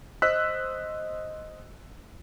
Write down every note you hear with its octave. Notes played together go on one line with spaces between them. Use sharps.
C5 D#5 E6 F#6 B6